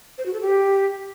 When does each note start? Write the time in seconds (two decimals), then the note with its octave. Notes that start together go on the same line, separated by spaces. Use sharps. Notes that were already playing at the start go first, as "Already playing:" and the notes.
0.18 C5
0.26 F#4
0.33 A4
0.41 G4